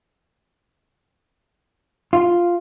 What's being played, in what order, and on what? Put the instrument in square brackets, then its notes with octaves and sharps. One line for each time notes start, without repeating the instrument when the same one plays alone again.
[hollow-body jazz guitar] F4